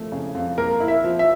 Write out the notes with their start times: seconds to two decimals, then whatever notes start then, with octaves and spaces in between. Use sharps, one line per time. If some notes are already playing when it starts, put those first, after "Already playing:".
Already playing: F3 A3
0.12 C#3
0.35 F2
0.58 A#3 A#4
0.80 E4
0.88 E5
1.04 F3
1.19 E5